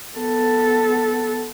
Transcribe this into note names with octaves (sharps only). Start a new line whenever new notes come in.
B3 A4